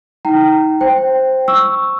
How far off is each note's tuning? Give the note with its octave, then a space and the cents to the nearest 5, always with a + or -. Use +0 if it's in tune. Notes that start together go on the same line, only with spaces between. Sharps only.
D#4 +25 G5 -25 A#5 -20
C5 +0 G5 +0
C#6 +0 E6 +0